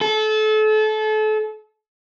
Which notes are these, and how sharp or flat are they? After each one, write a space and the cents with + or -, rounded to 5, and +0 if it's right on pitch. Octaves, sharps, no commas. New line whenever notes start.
A4 -30